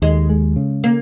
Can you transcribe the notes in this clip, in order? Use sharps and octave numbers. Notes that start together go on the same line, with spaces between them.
D#2 G#3
G#3
C#3
A#3